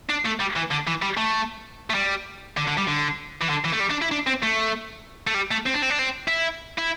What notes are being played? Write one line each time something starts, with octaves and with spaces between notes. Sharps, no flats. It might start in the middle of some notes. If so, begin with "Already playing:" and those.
D4
A3
G3
E3
D3
E3
G3
A3
A3
G3
D3
D3
G3
D3
E3
D3
E3
A3
G3
D4
E4
D4
C4
A3
A3
G3
A3
C4
D4
C4
D4
C4
E4
E4